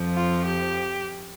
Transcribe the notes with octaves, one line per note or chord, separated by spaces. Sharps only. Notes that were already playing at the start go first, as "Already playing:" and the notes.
Already playing: F2 F3
F4
G4